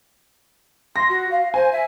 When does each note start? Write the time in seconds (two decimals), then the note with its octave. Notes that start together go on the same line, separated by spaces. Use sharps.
0.96 C6 A#6
1.09 F#4
1.31 F5
1.54 C5 G#5
1.72 E5